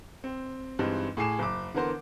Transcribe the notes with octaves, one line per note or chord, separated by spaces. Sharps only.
C4
G2 E3 G#3 C4 D#4
A2 G#4 G#5 D6 C7 E7
F#1 D6
D3 E3 B3 A#4 C5